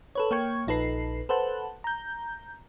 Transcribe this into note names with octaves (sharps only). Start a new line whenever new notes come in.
A4 B4 C#5
A#3 C#5 G5 C#6 G#6
A#1 D#4 A4 B4 C7
A4 B4 C5 F#5 A5
A#5 G6